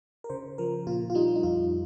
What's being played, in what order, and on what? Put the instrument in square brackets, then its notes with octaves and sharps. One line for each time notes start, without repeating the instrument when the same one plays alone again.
[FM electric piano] A#4
C#3 C5
F3 A#4
A#2 F4
F4
G3 D#4
D#4
F2 F4